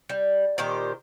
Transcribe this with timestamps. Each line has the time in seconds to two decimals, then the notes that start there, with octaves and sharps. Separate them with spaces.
0.09 G3
0.58 A#2 D#3 G4 C5